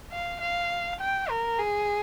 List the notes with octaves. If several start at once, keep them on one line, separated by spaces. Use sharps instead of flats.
F5
F5
G5
A#4
G#4